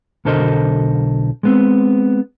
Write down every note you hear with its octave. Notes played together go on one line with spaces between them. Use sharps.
B1 D3 A4 A#4 C5 D#5
G#3 B3 C4